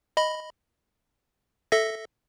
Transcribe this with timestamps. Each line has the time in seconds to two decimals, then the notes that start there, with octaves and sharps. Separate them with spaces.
0.17 D#5 B5
1.72 A4 E5 A#6